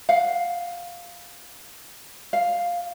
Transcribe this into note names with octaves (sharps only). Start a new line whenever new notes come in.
F5 F#5
F5